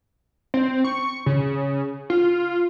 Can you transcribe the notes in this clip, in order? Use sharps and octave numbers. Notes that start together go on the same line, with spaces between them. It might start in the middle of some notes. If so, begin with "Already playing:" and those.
C4
C#6
C#3
F4